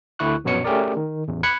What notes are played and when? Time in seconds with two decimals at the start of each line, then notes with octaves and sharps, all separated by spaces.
0.19 D2 D3 E4 C#6 F#6
0.44 A#1 F#2 B2 B3 C#5 C#7
0.64 A3 C#4 G4 G#4 A#4 D5
0.97 D#3
1.28 A1 E2
1.43 B5 F#6 G#6 C#7